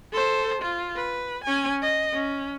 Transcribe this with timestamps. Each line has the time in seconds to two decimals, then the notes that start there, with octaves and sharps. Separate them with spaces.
0.12 A4 C5
0.62 F4
0.96 B4
1.44 C#4 G#5
1.82 D#5
2.13 C#4